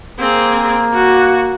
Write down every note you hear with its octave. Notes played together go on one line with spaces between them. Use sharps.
A#3 C4 G#4
F#4